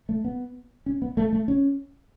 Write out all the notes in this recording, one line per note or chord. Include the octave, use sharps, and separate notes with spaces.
A3
B3
C#4
B3
A3
A3
C#4